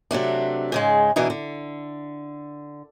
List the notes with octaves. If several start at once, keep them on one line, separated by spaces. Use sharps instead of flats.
C3 F#3 A3 D4
G#2 C#3 G#3
B2 D3 E3 D4 D#4
D3